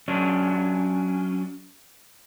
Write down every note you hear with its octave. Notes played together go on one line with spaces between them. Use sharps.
F#3 C#4 D4